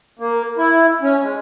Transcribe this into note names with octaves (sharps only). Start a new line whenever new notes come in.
A#3
E4
C#4
G#3